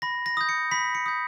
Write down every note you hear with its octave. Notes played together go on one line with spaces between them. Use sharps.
B5 A#6
A#6
D#6 G6
C#7
B5 B6
C#7
D#6 G6